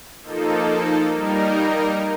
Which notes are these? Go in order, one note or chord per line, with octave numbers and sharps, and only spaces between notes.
F3 A#3 D#4 A4
G3 A#3 D#4 A#4